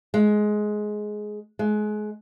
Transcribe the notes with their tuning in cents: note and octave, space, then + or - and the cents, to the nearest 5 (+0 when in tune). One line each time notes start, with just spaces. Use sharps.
G#3 +15
G#3 +30